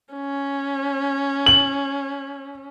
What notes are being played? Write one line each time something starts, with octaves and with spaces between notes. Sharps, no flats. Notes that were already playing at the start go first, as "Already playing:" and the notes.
C#4
F#7